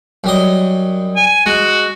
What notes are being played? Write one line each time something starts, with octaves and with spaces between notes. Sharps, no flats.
F#2 G3 D#5
G#5
G#3 F#4